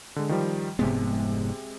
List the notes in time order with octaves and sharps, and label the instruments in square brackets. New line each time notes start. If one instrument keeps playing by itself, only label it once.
[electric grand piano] D3 G#3
D#3 F3 G3
[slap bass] F1 G#2 B3 [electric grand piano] C3 G#3